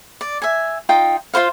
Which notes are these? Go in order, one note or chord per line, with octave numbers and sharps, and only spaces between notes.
D5
E5 G#5
D#4 F4 G5
F4 F#4 C5 F5